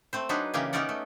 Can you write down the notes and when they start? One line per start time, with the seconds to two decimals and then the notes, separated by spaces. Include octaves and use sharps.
0.13 A3 C4 C5
0.29 F#3 D4 D#4 G#4 B4
0.54 C#3 E3 A#3 G4 G#4
0.73 B3 C#4 D#4 A#4 D5 F#5
0.89 A3